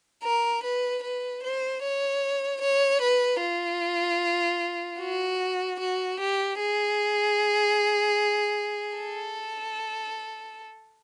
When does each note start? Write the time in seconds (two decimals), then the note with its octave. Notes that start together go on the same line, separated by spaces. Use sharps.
0.24 A#4
0.63 B4
1.03 B4
1.43 C5
1.83 C#5
2.61 C#5
3.01 B4
3.42 F4
5.01 F#4
5.80 F#4
6.20 G4
6.60 G#4
8.97 A4